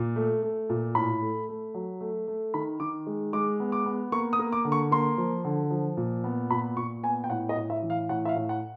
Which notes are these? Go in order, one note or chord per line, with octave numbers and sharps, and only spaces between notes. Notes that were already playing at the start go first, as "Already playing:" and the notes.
Already playing: A#2
A3
A3
A#2
A2 B5
A3
A3
F#3
A3
A3
D#3 B5
D#3 D6
G#3
G#3 D6
B3
D6
B3
A#3 C#6
D#6
A#3
D6
D3
C#6
A#3 C6
F3
D3
F3
A#2
B3
A#2 B5
A#2 C#6
B3 G#5
G5
A2 F#5
D#5
A2
E5
E3
F5
A2 F#5
E5
F5
A2
F#5